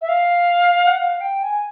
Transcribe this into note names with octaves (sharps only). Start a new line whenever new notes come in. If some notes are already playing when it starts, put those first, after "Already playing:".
E5
F5
F#5
F5
G5
G#5